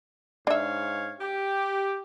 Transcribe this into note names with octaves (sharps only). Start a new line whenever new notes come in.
G#2 D4 C#5 E5 F5
G4